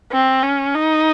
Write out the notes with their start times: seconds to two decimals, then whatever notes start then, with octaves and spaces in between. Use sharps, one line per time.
0.12 C4
0.43 C#4
0.74 D#4